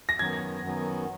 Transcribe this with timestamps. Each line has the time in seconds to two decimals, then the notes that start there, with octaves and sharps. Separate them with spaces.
0.09 A#6
0.19 F#2 D#3 F#3 B3 G#6
0.63 F#2 D#3 F#3 B3